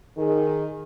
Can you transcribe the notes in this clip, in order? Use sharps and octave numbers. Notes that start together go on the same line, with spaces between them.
D#3 G#4